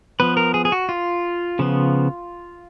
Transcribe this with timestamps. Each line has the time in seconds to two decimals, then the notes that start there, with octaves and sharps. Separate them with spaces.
0.20 F3 B3 B4
0.37 A#4
0.54 G#4
0.65 G#4
0.72 F#4
0.89 F4
1.59 C#3 F3 B3